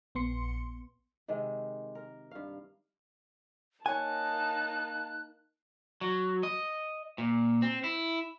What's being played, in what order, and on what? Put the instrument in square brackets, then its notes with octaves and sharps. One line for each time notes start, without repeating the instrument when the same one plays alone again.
[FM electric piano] A#1 B3 C6 C#7
[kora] C3 D#3 G#3
A#4
G2 F5
[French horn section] A#3 D#4 [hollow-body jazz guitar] C#5 G#5 [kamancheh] A5 [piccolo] F#6
[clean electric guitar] F#3
D#5
A#2
C4
E4